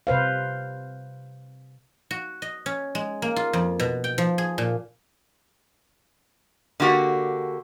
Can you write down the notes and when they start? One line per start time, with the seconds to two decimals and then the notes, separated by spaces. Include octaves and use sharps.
0.07 C3 B4 C5 F5
2.11 F#4
2.42 D#5
2.66 C#4
2.95 G#3
3.22 A#3
3.36 F4
3.53 F2
3.80 B2
4.04 G5
4.18 F3
4.38 G#4
4.58 A#2
6.80 D3 A#3 F#4 G4